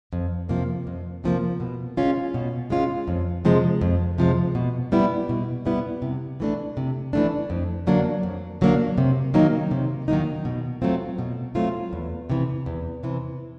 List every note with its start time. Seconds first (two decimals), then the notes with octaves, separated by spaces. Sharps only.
0.13 F2
0.49 C3 F3 A#3
0.87 F2
1.24 C3 F3 A#3
1.60 B2
1.97 G#3 C#4 F4
2.34 B2
2.70 G#3 C#4 F4
3.08 F2
3.45 C3 F3 G#3
3.81 F2
4.18 C3 F3 G#3
4.55 B2
4.92 G3 B3 E4
5.29 B2
5.66 G3 B3 E4
6.02 C3
6.40 E3 A3 D4
6.77 C3
7.13 E3 A3 D4
7.50 F2
7.87 D3 F#3 A#3 D4
8.23 F2
8.61 D3 F#3 A#3 D4
8.98 C3
9.34 D#3 F#3 A#3 D#4
9.71 C3
10.08 D#3 F#3 A#3 D#4
10.45 B2
10.82 F#3 A3 C4 F4
11.19 B2
11.55 F#3 A3 C4 F4
11.93 E2
12.30 C3 E3
12.66 E2
13.03 C3 E3